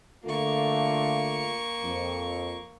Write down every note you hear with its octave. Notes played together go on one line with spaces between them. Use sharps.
D3 A3 A#3 F4 C#6
F2